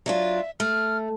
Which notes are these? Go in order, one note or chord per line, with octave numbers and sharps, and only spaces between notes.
F#3 D4 F4 E5
A3 F6